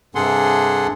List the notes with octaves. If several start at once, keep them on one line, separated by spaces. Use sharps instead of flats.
G2 C3 G#4 A4 F#5 C6